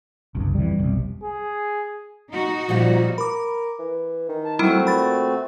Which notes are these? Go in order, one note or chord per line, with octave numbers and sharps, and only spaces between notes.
F#1 C2 G2
F2 E3 G3
F1 B1 C3
G#4
D#4 F#4
A#2 F3 G3
A#4 B5 D6
E3
D#3
A5
F#3 G3 A3 C4 E4 F#4
A#2 B5 A6